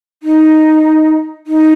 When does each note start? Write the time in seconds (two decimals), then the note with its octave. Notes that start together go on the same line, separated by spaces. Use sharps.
0.23 D#4
1.47 D#4